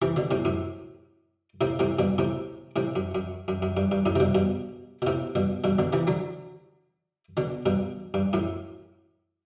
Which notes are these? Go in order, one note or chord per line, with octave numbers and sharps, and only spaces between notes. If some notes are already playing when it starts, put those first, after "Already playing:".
C3 E3
B2 D3
A2 C3
F#2 A2
A2 C3
A2 C3
G2 B2
A2 C3
A2 C3
F#2
F#2
F#2
F#2
G2
G2
F#2 A2
C3
G2 B2
G2 B2
B2
A2 C3
G2 B2
G2 B2
B2 D3
C3 E3
D3 F#3
B2 D3
G2 B2
G2
F#2 A2